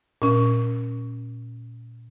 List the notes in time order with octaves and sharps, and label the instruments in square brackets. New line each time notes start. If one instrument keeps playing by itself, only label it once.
[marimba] A#2 C#4